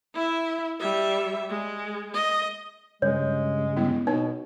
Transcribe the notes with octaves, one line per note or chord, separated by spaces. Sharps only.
E4 E5
G3 E5
G#3
D#5
G2 C#3 G#3 C#5
G3 B3 E4
B2 D#4 C#5